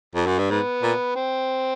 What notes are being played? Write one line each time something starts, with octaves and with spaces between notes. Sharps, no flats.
F2
F#2
G2
G#2 B3
A#2
C4